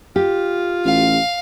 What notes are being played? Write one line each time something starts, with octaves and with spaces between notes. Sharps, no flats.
F4 G4
A1 F5